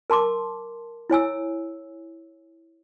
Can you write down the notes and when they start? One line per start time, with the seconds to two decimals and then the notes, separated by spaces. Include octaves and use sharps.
0.10 A#4 A5 C6 D6
1.10 E4 C#5 G#5 E6